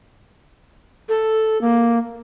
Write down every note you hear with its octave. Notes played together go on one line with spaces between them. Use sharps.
A4
A#3